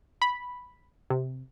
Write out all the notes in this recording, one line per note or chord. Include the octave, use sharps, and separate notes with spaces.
B5
C3